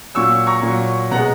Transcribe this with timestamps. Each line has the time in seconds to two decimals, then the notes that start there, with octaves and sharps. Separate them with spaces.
0.15 A#2 F#3 C#6 E6
0.47 A#5 C#6
0.63 A#2 F#3
1.11 B2 G#3 F#5 A#5